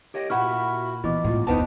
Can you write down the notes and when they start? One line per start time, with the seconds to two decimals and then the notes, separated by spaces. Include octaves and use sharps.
0.14 G4 C#5 D#5
0.30 C2 A#2 E4 F#4 B5 C#6 F6
1.04 B2 E3 E4 D6
1.24 A1 A2 G#3 F4
1.47 F#1 D#2 D#3 B3 D#4 C5 F#5 A5